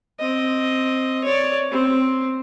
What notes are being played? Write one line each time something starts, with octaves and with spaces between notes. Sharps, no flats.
C4 D#5
C#5 D5
C4